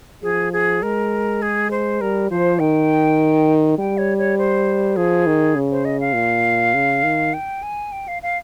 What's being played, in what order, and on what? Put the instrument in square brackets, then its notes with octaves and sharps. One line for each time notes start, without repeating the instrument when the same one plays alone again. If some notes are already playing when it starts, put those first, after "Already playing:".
[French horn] F3 [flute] G#4
[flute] G#4
[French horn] G#3 [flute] A#4
[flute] G#4
C5
[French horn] G3 [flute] A#4
[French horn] F3 [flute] C5
[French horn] D#3 [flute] G5
[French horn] G3 [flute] G5
[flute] C#5
C#5
C5
[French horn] F3 [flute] G#4
[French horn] D#3
C#3
[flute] C5
D#5
F5
[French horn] A#2
C#3
D#3
[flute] G5
G#5
G5
F5
F5